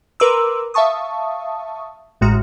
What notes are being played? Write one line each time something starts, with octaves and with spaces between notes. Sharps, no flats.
A#4 B4 A#5 C6 D6 E6
E5 F5 A5 C#6 D#6
A1 A2 G#3 F#4 A#5 F6